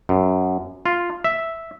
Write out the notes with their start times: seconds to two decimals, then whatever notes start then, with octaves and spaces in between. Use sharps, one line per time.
0.09 F#2
0.86 F4
1.24 E5